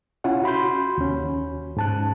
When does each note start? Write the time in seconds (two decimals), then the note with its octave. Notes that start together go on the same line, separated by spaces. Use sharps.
0.24 C#4 E4 F4 F#5
0.44 F#4 B5 C6 G6
0.98 D#2 C#4
1.77 G#2 A5 F#6